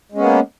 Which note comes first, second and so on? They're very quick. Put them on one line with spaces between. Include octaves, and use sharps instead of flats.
G#3 C#4 B3 A#3